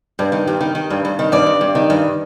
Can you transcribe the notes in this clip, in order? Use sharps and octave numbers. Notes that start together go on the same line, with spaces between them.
G2
D#3
G2
D#3
D#3
G2
G2
D#3
G2 D5
G2
G2
D#3
G2